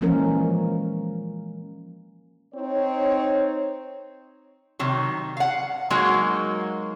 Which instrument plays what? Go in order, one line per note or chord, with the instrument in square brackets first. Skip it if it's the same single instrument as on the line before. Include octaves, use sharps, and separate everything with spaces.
[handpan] E3 F3 G#3 A#3 C#4 A#4
[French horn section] C4 D#4 C#5
[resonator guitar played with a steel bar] C3 D#3 F#3
F5 F#5
F#3 G#3 A#3 D#4 F#4